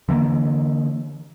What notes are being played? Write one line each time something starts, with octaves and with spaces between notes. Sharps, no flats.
D3 E3 A3 A#3